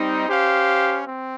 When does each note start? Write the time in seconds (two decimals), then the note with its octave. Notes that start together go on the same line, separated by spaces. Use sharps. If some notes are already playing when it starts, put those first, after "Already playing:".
Already playing: G3 C4 D#4
0.28 C#4 G4 C5 F5
1.06 C4